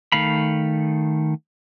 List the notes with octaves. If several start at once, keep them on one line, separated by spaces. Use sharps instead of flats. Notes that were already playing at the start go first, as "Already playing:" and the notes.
D#3 A3 F5 B5